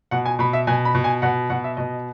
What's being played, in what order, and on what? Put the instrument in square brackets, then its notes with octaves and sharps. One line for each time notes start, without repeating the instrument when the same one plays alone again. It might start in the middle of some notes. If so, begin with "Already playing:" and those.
[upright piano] B2 F#5
G#5
B2 B5
E5
B2 G#5
B5
B2
G#5
B2 F#5
B2 F#5
E5
B2 D#5